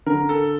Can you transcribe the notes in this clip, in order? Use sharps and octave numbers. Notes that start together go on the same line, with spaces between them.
D3 A#4
A4